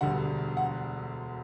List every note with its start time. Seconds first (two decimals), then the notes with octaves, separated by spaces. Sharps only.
0.01 E1 D2 D3 G3 F#5
0.57 F#5